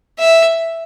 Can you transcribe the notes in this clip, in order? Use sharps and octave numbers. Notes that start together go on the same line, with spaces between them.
E5